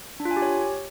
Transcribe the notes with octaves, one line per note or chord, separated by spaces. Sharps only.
D4
F4
G#5
G4
C#5